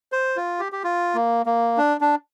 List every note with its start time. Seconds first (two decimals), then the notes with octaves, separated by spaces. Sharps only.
0.12 C5
0.36 F4
0.60 G4
0.72 G4
0.84 F4
1.15 A#3
1.46 A#3
1.78 D4
2.01 D4